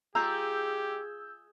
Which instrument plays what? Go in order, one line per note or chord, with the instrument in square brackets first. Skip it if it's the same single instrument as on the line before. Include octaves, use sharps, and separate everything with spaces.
[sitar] G#3 [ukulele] F4 A#5 [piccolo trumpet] G4 [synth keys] E6 G6